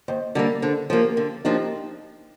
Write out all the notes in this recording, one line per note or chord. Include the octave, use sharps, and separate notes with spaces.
D#2 C5 D#5
D3 G3 A#3 A#4 D5
D3 A4 C5
F3 A#3 G4 A#4
D3
F3 A#3 D4 D#4 G4